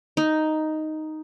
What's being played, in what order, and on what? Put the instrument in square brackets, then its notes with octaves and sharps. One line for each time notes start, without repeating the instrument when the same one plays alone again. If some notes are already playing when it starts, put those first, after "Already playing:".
[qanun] D#4